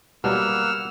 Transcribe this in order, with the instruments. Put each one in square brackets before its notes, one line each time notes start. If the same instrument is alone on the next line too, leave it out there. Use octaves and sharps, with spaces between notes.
[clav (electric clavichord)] B2 F#3 [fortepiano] G3 [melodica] A#3 F#5 [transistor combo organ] E6 F6